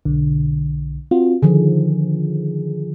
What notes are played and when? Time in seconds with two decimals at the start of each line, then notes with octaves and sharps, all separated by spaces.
0.05 B1 D3
1.11 C4 F4 F#4
1.42 D3 D#3 F3 G#4